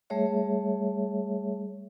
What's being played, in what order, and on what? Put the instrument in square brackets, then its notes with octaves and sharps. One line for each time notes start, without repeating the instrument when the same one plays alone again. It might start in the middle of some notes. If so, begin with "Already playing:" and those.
[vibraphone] G3 A3 G#4 C#5 E5